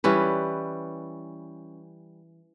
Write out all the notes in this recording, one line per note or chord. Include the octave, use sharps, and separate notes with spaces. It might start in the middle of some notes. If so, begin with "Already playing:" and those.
E3 G3 C#4 B4